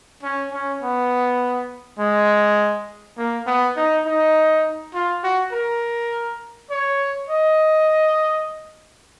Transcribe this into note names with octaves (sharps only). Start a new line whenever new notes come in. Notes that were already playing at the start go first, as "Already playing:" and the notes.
C#4
C#4
B3
G#3
A#3
B3
D#4
D#4
F4
F#4
A#4
C#5
D#5